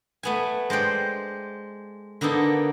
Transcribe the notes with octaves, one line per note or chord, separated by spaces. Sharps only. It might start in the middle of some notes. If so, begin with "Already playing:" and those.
A3 B3 G#5
G#3 C5 D5 G5
D3 A#3 B3 D#4 A4